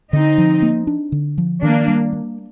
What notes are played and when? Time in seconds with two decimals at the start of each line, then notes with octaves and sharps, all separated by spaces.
0.13 D3 C4 D#4
0.38 F3
0.62 A#3
0.87 D4
1.12 D3
1.38 F3
1.62 D#3 A#3 D4
1.88 G3
2.13 A#3